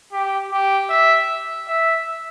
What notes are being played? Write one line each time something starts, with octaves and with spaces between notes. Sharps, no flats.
G4
G4
E5
E5